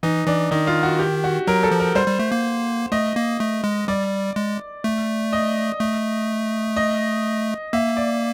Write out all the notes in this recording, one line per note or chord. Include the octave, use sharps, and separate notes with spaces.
E3 D#4
E3 D4
D#3 D#4
F4
F#4
G4
F#4
F#3 A#4
A4
F3
A#4
G3 C5
G3
A3
A#3
A3 D#5
A#3
A3
G#3
G3 D5
G#3
A3
D#5
A3
D#5
A#3 E5
D5